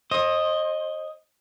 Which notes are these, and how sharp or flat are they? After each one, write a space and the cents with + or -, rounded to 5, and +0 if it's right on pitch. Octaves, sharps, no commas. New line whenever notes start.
C5 +35 D#5 +0